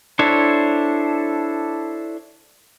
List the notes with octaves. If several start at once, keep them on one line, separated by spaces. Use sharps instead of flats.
D4 E4 A4 C5 C#5